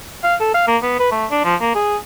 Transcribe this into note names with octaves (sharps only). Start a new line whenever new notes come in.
F5
A4
F5
A#3
B3
B4
A3
D4
F3
A#3
G#4